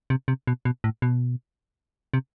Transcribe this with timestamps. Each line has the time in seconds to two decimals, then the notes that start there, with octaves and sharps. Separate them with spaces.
0.10 C3
0.28 C3
0.47 B2
0.65 B2
0.84 A2
1.02 B2
2.14 C3